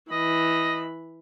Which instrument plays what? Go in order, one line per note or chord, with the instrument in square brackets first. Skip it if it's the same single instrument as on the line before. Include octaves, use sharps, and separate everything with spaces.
[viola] E3 B5 [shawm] D#5